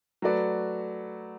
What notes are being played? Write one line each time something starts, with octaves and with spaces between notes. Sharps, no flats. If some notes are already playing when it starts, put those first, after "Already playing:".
F#3 A3 F#4 B4 D5